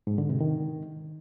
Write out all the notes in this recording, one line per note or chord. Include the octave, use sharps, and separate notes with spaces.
G#2
D3
C3
D#3